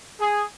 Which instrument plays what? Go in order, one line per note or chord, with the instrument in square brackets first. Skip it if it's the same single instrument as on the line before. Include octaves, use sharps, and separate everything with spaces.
[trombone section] G#4